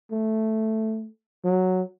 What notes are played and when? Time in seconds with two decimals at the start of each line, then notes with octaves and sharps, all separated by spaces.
0.12 A3
1.45 F#3